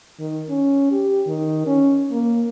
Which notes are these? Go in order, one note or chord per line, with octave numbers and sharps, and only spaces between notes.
D#3
C#4
G4
D#3
C#4
A#3